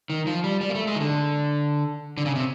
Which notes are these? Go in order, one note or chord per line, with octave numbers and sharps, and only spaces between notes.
D#3
F3
G3
G3
A#3
A3
G#3
D#3
D3
D3
C#3
C3